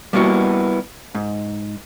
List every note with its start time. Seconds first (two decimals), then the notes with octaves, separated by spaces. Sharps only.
0.13 G3 A#3 B3 E4 F#4
1.15 G#2